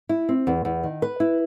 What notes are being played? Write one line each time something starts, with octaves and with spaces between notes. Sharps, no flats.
E4
C4
E2
E2
D#3
B4
E4